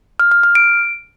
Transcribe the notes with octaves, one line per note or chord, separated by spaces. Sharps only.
F6
F6
F6
D7